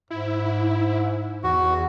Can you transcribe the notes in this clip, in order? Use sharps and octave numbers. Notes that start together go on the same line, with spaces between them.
G#2 E4
E2 F#4